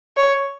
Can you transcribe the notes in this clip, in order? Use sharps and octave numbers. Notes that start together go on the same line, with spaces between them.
C#5